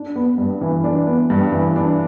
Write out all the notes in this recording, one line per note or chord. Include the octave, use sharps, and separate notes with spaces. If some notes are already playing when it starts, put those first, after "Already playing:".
Already playing: D4
B3
G2
E3
D4
B3
G2
E3
D4